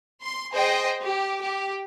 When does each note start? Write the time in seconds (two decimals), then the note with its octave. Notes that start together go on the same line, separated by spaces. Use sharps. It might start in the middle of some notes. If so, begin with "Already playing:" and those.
0.22 C6
0.52 G#4 C5 D#5 G5
1.03 G4
1.41 G4